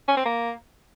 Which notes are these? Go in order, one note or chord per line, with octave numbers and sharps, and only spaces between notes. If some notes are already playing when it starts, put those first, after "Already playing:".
C#4
C4
A#3